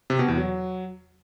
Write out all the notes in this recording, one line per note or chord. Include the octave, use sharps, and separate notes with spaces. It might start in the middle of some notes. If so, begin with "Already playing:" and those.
C3
B2
E2
F#3